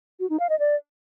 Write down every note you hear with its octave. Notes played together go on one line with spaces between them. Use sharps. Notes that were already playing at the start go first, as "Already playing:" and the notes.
F#4
D#4
F5
D#5
D5